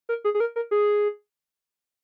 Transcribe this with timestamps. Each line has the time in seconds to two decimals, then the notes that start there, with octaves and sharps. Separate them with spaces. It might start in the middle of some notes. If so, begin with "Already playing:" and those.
0.09 A#4
0.24 G#4
0.34 G#4
0.40 A#4
0.56 A#4
0.71 G#4